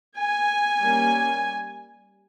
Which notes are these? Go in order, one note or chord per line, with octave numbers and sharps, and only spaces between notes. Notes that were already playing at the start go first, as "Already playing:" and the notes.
G#5
G3 A#3 C#4